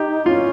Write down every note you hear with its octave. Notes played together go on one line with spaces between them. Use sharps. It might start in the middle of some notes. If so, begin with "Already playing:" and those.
Already playing: D#4 G4
C#4 F4